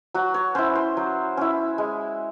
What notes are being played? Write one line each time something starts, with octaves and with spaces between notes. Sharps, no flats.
F#3 F#4
C#5
C#4 E4 C5
C5
F#3
C#4 E4
G#3